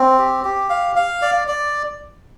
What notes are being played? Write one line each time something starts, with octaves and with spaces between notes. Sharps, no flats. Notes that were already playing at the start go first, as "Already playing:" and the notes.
Already playing: C4
G4
G4
F5
F5
D5
D5